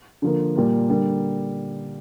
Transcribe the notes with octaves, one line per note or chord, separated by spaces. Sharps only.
D3 F3 A#3
A#2 G3 A#3
D3 G3 A#3